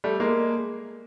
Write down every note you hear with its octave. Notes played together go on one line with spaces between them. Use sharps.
G3 A3
G#3 A#3